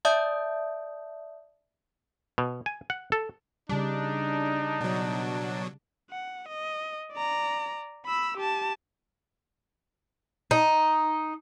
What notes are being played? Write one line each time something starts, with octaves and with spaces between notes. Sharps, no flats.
D5 E5 A5 D#6 G6
B2
G#5
F#5
A4
C#3 G3 D4 D#4
B2 F#3
F#5
D#5
D5 A#5
B5 E6
G4 A5
D#4